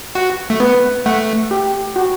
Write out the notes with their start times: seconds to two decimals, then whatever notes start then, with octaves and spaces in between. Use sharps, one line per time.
0.15 F#4 F#5
0.50 A3
0.60 B3 B4
1.06 A3 F#5
1.51 G4
1.96 F#4